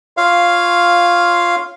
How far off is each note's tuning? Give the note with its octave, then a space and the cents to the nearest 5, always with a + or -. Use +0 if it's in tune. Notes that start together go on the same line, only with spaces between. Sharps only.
F4 +0 C#5 +0 F5 -5